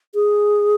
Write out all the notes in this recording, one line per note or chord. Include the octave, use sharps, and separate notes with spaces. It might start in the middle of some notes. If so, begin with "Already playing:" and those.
G#4